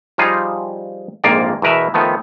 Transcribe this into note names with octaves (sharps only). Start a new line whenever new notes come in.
F3 G3 D#4 F4 G#4
A#1 F2 G#2 A#3 F4 D5
E2 B2 A#4 B4 E5
D#3 F3 A3 B3